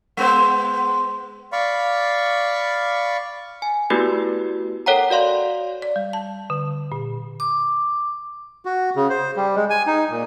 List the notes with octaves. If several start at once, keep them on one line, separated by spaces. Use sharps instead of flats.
G#3 B3 C5
D5 F5 B5 C#6
G#5
A3 B3 E4 F#4 G4 B4
A4 A#4 C#5 F#5 G5 A#5
F#4 D5 F5 C6
D5
G3
A5
D3
A#2
D6
F#4
C#3
C5
G3
G#3
G#5
D#4
A#2